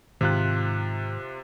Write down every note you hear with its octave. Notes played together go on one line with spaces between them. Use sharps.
G#2 C3 D#3 F4 F#6